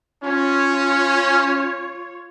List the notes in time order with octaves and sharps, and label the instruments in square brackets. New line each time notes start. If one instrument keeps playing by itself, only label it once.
[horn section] C#4 [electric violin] F4 C#5